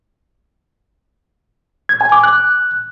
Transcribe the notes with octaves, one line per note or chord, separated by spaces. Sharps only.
G#6
G#5
D6
F#6